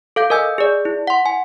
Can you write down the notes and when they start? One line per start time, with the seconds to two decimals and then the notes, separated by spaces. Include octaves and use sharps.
0.16 A4 F5 G6
0.30 A#4 D#5 G#5 E6 G6
0.58 G#4 D5
0.85 E4
1.07 F#5 C6
1.26 G#5